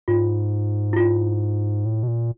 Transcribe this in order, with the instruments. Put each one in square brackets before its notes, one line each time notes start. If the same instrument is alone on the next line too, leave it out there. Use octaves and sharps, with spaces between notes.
[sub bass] G#2 [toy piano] F4
[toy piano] E4
F4
[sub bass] A2
B2
A#2